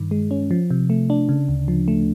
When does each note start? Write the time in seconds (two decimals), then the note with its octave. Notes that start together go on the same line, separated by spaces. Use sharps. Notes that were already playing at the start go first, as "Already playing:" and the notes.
Already playing: G2 D#3
0.11 G#3
0.31 C#4
0.51 F3
0.70 C3
0.90 A3
1.10 D4
1.29 C#3
1.48 D2
1.68 F3
1.88 A3